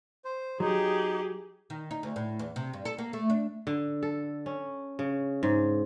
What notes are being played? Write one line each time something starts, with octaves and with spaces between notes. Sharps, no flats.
C5
F#3 D#4 G4 G#4
D#3
D#4
D2
A2
E2
C3
G2
A4
A#3
A3
D4
D3
A4
C#4
C#3
G#2